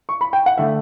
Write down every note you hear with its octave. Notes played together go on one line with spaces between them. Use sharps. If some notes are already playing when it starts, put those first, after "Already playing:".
C#6
B5
G5
F#5
D3 A3 E5